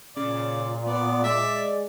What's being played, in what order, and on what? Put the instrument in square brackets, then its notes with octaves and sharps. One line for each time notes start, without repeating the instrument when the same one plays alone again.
[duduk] A#2 [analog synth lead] C#3 [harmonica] D5
[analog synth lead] B3 [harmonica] D5
[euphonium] G#3 [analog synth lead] D5 [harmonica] E5